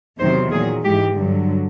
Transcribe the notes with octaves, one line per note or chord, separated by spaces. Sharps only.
E2 C3 D#3 F#3 C5
A#2 F#3 G#4
G#2 E3 G#3 G4
G2 D3 F#3